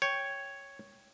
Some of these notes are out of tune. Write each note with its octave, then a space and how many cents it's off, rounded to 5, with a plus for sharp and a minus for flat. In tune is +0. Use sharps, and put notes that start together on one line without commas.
C#5 +0 G5 +0